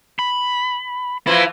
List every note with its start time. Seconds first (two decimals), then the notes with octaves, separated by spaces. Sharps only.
0.19 B5
1.27 E3 F3 A#3 E4